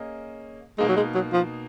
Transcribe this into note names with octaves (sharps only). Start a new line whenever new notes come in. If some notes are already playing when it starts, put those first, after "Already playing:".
Already playing: A#3 C#4 G#4 D#5
B2 G#3 A#3 D#4
F#3
G#3
F#3
F3